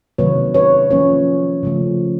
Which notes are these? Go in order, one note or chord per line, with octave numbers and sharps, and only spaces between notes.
C3 D#3 F#3 A#3 B4 C#5
B4 C#5
F3 A#3 C#4 B4 C#5
C#3 F3 A3